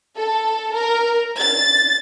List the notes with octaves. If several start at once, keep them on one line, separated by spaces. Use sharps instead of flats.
A4
A#4
A6